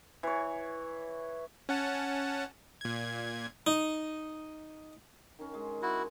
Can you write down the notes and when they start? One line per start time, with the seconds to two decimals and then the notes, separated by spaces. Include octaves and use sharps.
0.23 E3 C#5
1.69 C#4 F#5 A5
2.81 A#2 G#6
3.67 D#4
5.39 D#3 C#4
5.54 G#3
5.82 E4 F#4